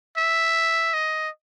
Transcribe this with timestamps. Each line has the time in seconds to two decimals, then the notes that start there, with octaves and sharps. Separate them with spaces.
0.17 E5
0.94 D#5